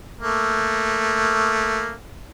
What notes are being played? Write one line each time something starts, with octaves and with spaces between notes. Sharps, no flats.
A3 A#3